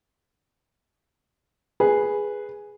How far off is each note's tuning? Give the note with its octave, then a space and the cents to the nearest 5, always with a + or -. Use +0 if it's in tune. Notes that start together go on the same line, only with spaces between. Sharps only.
G#4 +0 B4 -5